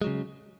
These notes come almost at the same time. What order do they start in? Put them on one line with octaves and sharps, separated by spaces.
G#3 F#3 C#3